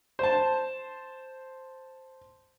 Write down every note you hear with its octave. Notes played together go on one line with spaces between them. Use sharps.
C5 A5